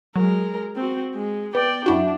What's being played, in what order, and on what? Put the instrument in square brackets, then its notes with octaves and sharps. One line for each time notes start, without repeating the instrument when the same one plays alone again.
[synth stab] F#3 [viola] G#3 A#4
[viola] C4 F#4
G#3
[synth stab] B3 [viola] D5 G5
[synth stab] F#2 E4 F#4 [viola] D4